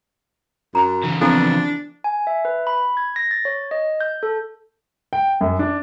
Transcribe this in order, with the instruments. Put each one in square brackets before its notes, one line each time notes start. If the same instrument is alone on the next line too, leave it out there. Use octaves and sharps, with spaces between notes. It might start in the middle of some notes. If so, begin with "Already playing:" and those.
[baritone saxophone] F#2 [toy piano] A#5
[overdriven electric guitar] C#3 E3
[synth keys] F3 B3 C4 [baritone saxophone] D4 [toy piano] E4 A4 G#5
[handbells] G#5
E5
B4
B5
G#6
A#6
A6
C#5
D#5
G6
A4
[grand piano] G5
F#2
D4